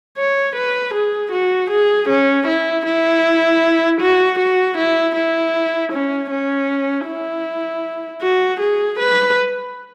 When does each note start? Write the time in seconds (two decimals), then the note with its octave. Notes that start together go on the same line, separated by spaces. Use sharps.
0.17 C#5
0.56 B4
0.94 G#4
1.32 F#4
1.70 G#4
2.09 C#4
2.47 E4
2.86 E4
4.01 F#4
4.39 F#4
4.77 E4
5.15 E4
5.92 C#4
6.30 C#4
7.07 E4
8.22 F#4
8.60 G#4
8.99 B4